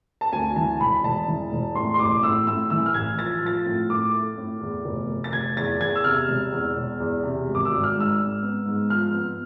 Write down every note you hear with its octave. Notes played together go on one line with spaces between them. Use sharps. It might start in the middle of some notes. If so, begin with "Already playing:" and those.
A5
D2 G#5
E3 A5
E1 B5
E1 A5
E3
E1
A2 C6
C6
A1 D6
A2 E6
A2 E6
E3 E6
F6
A1 G#6
F3 A6
F3 A6
A2
A2 D6
A3
A2
E2
F1
F1
A6
F1 G#6
E2 A6
E2 G#6
E6
C3 F6
E1
E2
E1
E2
C3
G#1
D6
E6
G#1
F6
G#2 E6
G#2
B3
G#2
F3 F6
B3